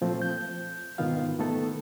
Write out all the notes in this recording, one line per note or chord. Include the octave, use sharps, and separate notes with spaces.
A#2 F3 A3 C4
G6
G#2 B2 D#3 B3 F4 F5
D#3 A3 B3 A4